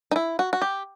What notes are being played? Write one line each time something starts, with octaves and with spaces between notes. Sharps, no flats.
D#4
E4
F#4
F#4
G4